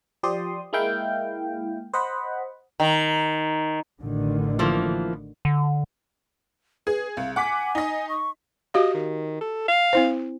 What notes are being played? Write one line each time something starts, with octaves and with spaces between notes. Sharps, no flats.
F3 G4 D5 C6 D#6
G#3 A#3 E4 F5 G5
C5 D#5 F#5 B5
D#3
A1 D3 D#3
E3 F3 A#3
D3
G#4 B4
C2 F5
F#5 G#5 D6 B6
D#4 D#5
C#6
F#4 G4 D#5 F5
D#3
A4
F5
C4 E4 C5